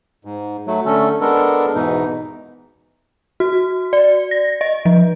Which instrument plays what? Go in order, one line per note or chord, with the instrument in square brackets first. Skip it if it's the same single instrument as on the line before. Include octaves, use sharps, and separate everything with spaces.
[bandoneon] G#2
F#3 A3
D3 A3 C#4 A4
G#3 B3 D4 A4 A#4
E2 G#2 B2 E3 D#4
[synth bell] F#4
D5
A#6
D#5
F3